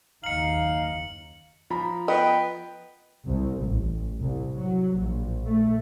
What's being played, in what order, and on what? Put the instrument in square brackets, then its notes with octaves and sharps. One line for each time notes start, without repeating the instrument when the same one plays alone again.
[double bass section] F#1 D#2 [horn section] D#4 F5 [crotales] C#7 F#7
[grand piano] F3 A#5 B5
[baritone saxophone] B3 [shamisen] D#5 [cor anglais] G5
[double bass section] C2
A1
C2
F#3
A#1
A3